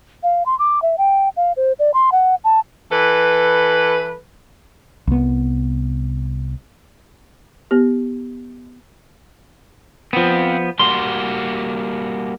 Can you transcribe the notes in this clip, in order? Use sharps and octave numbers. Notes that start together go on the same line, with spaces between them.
F5
C6
D6
E5
G5
F5
C5
D5
C6
F#5
A5
E3 A4 B4
C2 B3
B3 G4
F3 B3 C4 F4
G3 A#3 F#4 C6